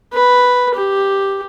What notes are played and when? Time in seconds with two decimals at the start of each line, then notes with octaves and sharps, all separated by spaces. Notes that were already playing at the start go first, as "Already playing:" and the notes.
0.14 B4
0.75 G4